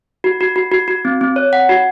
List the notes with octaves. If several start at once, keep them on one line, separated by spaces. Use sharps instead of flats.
F#4
F#4
F#4
F#4
F#4
C4
C4
C#5
F#5
F#4